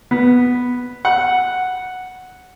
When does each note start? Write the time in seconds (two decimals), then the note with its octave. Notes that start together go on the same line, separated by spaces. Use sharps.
0.11 B3
1.05 F#5